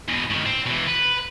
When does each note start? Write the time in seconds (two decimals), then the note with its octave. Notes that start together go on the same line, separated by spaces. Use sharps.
0.08 E2 B2
0.30 A2 D#3
0.46 C4
0.67 B2 E3
0.87 B4